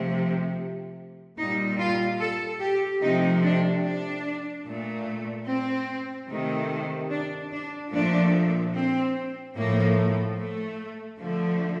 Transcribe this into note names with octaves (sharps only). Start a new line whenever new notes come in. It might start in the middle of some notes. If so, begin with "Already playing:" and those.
Already playing: C3 F3 A3
A#2 G3 D#4
F4
A4
G4
C3 F3 A3 D#4
D4
D4
A#2 A3
C4
C3 D#3 A3
D4
D4
A#2 F3 A3 D4
C4
A2 F3 A3 A#3
A3
D3 F3 A3